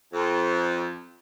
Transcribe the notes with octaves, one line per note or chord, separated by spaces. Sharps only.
F2